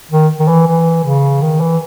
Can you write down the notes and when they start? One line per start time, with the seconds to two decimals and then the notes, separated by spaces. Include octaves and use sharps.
0.11 D#3
0.40 D#3
0.48 E3
0.67 E3
1.04 C#3
1.41 D#3
1.61 E3